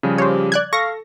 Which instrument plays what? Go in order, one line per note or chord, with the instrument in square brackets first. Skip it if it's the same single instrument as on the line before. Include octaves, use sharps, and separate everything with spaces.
[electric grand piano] C#3 F3 G3
[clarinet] G4 [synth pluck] C5 C#5
[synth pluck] D5 F#6 G#6
[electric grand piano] A4 [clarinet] F5 [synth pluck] C#6 A#6